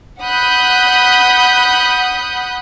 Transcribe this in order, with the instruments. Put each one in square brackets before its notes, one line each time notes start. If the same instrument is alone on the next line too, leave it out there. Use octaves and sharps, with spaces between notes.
[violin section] F#5 B5 D#6 F#6 G6